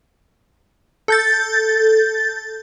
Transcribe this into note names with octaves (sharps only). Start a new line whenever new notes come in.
A4 G6 A6